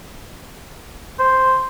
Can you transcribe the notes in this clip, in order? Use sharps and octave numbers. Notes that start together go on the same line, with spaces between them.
C5